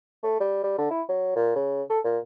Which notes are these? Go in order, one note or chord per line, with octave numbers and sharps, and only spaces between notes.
A3
G3
G3
D3
E4
F#3
A#2
C#3
A4
A#2